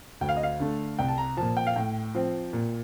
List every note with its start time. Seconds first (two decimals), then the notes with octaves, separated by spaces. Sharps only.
0.21 D2 G5
0.29 F5
0.36 D#5
0.43 F5
0.60 D3 A3
0.99 C2 G5
1.08 A5
1.18 A#5
1.37 A#2 F3 A5
1.57 G5
1.67 F5
1.76 A2 G5
2.15 F3 C4
2.53 A#2